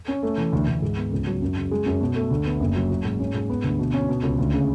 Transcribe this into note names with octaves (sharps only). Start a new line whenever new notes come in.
C#4
A3
E3
D2
D2
G#2
B3
C#2
F#3
F#2
C#3
G#3
F#2
B2
A3
D2
B3
F#1
F#3
F#4
G#2
C#4
G#2
B3
D2
B2
C#4
B2
C#2
D2
C#3